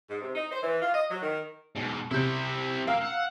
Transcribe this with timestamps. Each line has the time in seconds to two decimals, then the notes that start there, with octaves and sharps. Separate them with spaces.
0.10 G#2
0.22 C3
0.35 D#4
0.51 C5
0.63 E3
0.82 F4
0.94 D#5
1.10 F#3
1.23 D#3
1.76 G#2 B2
2.11 C3 C4 E4 G6
2.87 A#3 F5 E6
3.01 F#5